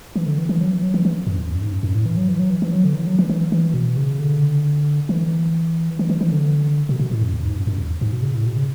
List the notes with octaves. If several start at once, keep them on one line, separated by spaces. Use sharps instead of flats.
E3
D3
E3
E3
F#3
E3
F#3
E3
E3
F#2
E2
F#2
G#2
F#2
F#2
A2
E3
F#3
E3
F#3
E3
E3
F#3
D3
E3
F#3
E3
E3
E3
B2
C#3
D3
E3
E3
E3
E3
D3
B2
B2
A2
F#2
E2
G#2
F#2
F#2
E2
G#2
B2
C#3
A2
B2
C#3